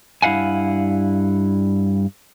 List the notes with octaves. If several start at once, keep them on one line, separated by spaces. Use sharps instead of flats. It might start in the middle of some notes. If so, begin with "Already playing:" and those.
G2 E4 F5 F#5 G#5